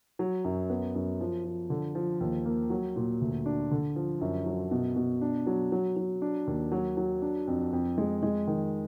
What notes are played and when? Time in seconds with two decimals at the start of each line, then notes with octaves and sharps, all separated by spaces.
0.19 F#3
0.45 F#2
0.70 B3
0.95 F#2
1.21 F3
1.45 F3
1.70 D3
1.95 F3
2.20 D#2
2.45 A#3
2.70 F#3
2.96 A#2
3.21 D2
3.46 D4
3.71 D3
3.96 F3
4.21 F#2
4.46 F#3
4.71 B2
4.96 B2
5.22 D4
5.47 F#3
5.72 F#3
5.96 F#3
6.22 D4
6.47 D#2
6.72 F#3
6.97 F#3
7.22 D4
7.47 F2
7.73 F2
7.98 G#3
8.23 G#3
8.47 D#3